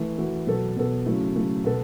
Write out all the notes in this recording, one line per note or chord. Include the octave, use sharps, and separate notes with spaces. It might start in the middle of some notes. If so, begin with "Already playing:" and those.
Already playing: E3 A3
E3 A3 F#4
B2 F#3 B3 A4
B2 F#3 B3 A4
C#3 F#3 A3 E4
C#3 F#3 A3 E4
B2 B3 A4